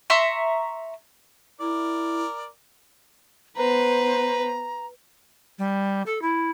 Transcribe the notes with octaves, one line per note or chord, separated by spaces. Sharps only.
E5 A#5 C6 C#6
E4 A#4 D5
B3 B4 C5 A#5
G3
A4
E4